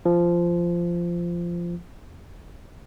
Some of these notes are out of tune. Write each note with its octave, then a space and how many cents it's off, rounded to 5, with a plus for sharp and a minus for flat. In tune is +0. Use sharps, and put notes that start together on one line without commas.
F3 -15